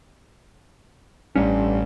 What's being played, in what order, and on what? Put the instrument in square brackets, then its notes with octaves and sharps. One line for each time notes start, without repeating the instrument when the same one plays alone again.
[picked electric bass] A1 C#4 [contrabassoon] G2